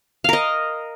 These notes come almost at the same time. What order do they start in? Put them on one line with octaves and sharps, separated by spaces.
F5 A#4 D#5